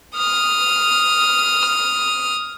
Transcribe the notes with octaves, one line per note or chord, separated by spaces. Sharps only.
D#6 F6